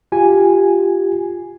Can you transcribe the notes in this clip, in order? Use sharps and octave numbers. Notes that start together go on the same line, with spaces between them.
F4 G4 G#5